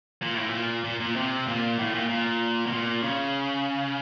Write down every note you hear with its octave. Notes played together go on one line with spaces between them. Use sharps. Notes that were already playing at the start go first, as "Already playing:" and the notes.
A#2
A2
A#2
A#2
A#2
C3
A#2
A2
A#2
A#2
B2
A#2
C#3